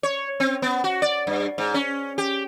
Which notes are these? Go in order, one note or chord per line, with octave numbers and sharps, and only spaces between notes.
C#5
C4
B3
F#4
D5
G2
G#2
C#4
G4